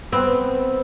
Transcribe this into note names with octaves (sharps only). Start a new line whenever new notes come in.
B3 C4